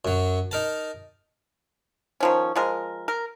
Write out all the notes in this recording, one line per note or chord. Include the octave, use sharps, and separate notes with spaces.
F#2 F#3
D#4 A#4 A5
D#3 F3 C#4
F3 G#3 A#4
A#4